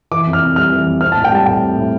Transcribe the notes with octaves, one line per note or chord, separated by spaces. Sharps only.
E3 D6
F2
F6
C3
G3 F6
E3
F2
C4 F6
A5
A2
G5
G3 A5
A2 G5
C4
A2